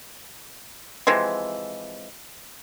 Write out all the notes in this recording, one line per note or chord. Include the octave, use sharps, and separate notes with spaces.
C3 E3 F3 G#3